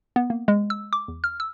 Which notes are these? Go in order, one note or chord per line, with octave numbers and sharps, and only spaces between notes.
B3
A#3
G#3
E6
D6
E2
F6
E6